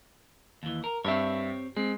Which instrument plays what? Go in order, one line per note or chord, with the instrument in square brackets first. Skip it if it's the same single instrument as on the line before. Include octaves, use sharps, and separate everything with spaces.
[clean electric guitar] D#2 E3
A#4
[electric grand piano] G2 E5 [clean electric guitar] C4 G4 C#5
[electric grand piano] G#3 [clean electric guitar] C4